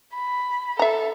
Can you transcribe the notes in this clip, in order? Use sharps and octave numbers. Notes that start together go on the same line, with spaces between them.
B5
A4 E5 A#5